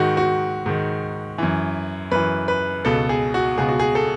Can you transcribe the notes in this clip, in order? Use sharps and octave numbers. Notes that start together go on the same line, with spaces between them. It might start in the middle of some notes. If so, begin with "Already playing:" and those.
Already playing: G#2 D#3 F#4
F#4
G#2 D#3
F#2 E3
F#2 E3 B4
B4
C#2 B2 A4
G#4
F#4
C#2 B2 G#4
F#4
G#4
A4